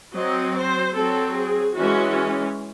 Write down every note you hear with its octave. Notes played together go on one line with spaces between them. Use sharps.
F#3 C4 D#5
C5
C4 A4
F#3
G#4
E3 G#3 C#4 F#4